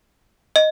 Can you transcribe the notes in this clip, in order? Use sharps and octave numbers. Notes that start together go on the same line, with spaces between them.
D#5